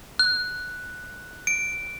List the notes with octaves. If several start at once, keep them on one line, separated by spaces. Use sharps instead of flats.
F#6
D7